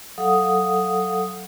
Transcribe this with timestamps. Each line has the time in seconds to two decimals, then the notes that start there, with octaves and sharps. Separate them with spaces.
0.18 F#3 A4 F5 F#5 D#6